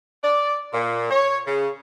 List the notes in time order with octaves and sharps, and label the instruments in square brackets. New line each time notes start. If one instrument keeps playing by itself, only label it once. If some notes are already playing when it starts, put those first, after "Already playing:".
[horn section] D5
A#2
C#5
C#3